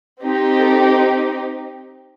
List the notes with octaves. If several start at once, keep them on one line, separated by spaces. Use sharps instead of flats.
C4 D#4 G4
A4